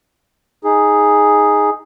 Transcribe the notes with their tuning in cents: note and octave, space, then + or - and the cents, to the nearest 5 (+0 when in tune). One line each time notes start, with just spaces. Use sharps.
D#4 +10 G#4 +0